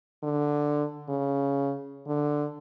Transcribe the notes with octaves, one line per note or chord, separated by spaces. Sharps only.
D3
C#3
D3